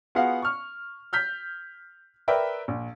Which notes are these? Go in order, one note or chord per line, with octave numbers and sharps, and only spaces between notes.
B3 F4 F#4 G#4 F5 F#5
C#6 F6
F6 G6 B6
A#4 B4 D5 E5 G5
A#1